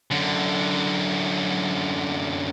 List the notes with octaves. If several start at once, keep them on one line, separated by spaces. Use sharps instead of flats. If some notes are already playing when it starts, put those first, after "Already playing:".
F#2 D3